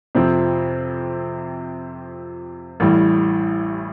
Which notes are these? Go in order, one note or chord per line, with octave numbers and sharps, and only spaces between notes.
F2 C3 F3 C4
A1 A2 E3 G3